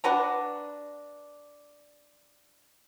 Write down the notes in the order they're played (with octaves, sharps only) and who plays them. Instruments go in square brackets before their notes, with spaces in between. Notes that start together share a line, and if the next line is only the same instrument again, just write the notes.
[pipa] D4 F#4 B4 A#5